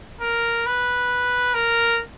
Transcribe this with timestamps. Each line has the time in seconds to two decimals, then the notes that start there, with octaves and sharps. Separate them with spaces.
0.21 A#4
0.66 B4
1.54 A#4